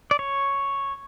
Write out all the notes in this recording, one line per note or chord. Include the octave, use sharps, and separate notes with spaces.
D5
C#5